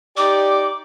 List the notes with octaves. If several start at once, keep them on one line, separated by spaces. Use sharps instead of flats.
D#4 G4 D5 D6